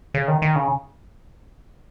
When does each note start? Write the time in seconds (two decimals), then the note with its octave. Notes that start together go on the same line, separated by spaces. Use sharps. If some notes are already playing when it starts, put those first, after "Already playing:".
0.14 C#3
0.28 D#3
0.42 D#3
0.56 C#3